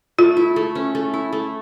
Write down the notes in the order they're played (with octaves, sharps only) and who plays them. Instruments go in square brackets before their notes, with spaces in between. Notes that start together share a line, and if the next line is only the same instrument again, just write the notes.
[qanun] A3 [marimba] F4
[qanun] E4
A3
C#4
A3
E4
A3